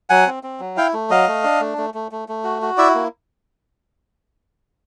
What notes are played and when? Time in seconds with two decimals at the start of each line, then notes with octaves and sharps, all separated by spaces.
0.10 F#3 F#5 G#5
0.26 C4
0.43 C4
0.60 F#3
0.77 E4 F5 G5
0.93 A3
1.10 F#3 D#5 F5
1.28 A3
1.44 D4
1.61 A3
1.78 A3
1.94 A3
2.12 A3
2.28 A3
2.44 F#4
2.62 F#4
2.78 E4 D5 E5
2.95 A#3